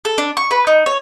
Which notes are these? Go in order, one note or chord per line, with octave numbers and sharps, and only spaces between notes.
A4
D4
C#6
B4
D#4
C#5